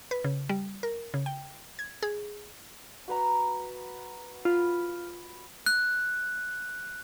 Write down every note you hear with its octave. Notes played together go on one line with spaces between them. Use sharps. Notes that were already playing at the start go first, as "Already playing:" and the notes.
B4
C#3
G3
A#4
C#3
G5
G#6
G#4
F#4 B4 A#5
F4 B5
F#6